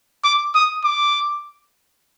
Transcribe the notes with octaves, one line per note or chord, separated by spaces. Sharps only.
D6
D#6
D6